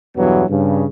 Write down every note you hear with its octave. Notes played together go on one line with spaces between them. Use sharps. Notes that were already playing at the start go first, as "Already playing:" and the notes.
E2 G2 B2 E3 F#3 B3
G2 C#3